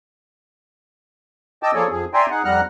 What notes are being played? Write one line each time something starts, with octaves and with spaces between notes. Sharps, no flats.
D#5 G5 A5 D6 E6
F3 A#3 G#4 A4 C#5 D5
F2 F3 G#4
D5 E5 G5 G#5 A#5 C6
D#4 G#4 F#5
F2 G3 F#5 A#5 F6 F#6